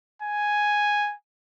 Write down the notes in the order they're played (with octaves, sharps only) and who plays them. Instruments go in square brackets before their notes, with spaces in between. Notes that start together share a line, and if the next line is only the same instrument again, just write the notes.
[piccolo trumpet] G#5